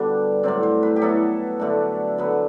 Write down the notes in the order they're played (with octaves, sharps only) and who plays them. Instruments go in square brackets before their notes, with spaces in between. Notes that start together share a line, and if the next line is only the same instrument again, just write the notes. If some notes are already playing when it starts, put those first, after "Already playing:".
Already playing: [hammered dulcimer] B2 D3 G3 B3 D4 F#5
A2 F#3 C4 D5
C5
B4
G4
F#3 B3 E4 A4
D3 A3 D4
D3 F#3 B3 B4